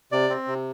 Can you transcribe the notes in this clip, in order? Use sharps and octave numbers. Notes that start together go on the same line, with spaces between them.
C3 D5
C4
C3